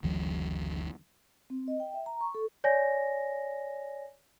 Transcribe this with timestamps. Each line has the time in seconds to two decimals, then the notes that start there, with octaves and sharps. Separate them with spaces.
0.03 F#1 D2 E3 F#3
1.50 C4
1.68 D#5
1.80 G5
1.94 E5
2.06 A#5
2.21 C#6
2.35 A4
2.64 C#5 D5 G#5 A#6